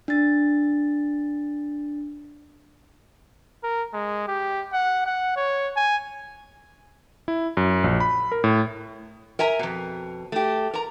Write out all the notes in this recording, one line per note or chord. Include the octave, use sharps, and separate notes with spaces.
D4 A6
A#4
G#3
G4
F#5
F#5
C#5
G#5
E4
F#2
A#1
B5
A#4
A2
A#4 E5 G#5 A#5
F2 B2
A3 G4
A#4 A#5